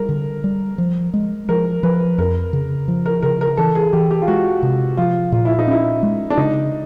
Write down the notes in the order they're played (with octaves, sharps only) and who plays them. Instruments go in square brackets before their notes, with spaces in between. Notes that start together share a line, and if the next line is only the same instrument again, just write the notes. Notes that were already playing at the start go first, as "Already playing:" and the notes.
Already playing: [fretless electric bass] G3 [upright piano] A#4
[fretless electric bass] D3
G3
F3
G#3
[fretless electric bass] F3 [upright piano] A#4
[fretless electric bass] F3 [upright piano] B4
[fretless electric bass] F2 [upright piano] A#4
[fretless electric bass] C#3
F3
[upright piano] A#4
[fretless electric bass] C#3 [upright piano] A#4
[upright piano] A#4
[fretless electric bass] E3 [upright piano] A4
[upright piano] G#4
[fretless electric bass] E3 [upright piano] G4
[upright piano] G4
F4
[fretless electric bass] G#3 [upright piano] F#4
[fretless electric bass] C3
[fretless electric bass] F3 [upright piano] F4
[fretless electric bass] A#2 [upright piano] F4
[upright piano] E4
D#4
[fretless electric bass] C#4 [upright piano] E4
[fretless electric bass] G#3
[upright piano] D4
[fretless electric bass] C#3 [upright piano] D#4